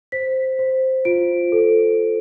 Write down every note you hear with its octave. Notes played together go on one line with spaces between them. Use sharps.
C5 B6
C5
F4 D7
A4